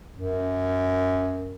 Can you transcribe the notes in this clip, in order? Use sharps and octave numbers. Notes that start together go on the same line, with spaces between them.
F#2